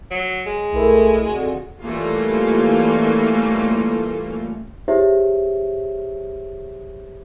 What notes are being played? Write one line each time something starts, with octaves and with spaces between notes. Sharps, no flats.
F#3
G#3
B1 A3 E4 A#4
F2 D3 F#4
E3 G3 A3 A#3 C#4 F4
E4 G4 G#4 C5 C#5 E5